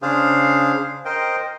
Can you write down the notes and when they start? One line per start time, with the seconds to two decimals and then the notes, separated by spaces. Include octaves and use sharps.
0.02 C#3 D4 G#4 C5 F5
1.05 A#4 C5 D#5 G5